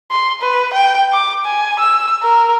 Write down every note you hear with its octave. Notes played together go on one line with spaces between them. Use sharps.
C6
B4
G5
D6
G#5
E6
A#4